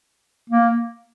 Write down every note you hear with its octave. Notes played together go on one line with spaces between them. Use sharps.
A#3